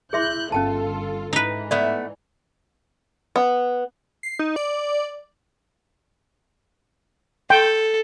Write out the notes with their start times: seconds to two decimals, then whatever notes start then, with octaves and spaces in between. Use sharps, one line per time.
0.13 E4 G#4 E5 C6 F#6 G6
0.52 G1 C#4 F4 A4 G5 A5
1.33 G#2 E3 D#4 B4
1.71 A3 B3 D5 E5
3.36 B3
4.23 C7
4.39 D#4
4.56 D5
7.50 A4 G5